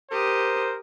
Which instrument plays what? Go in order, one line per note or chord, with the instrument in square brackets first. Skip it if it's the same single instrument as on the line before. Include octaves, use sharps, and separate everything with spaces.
[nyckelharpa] G4 D#6 [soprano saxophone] A#4 [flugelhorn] C5